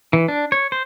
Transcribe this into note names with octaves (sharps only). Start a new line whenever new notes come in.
E3
D4
C#5
C5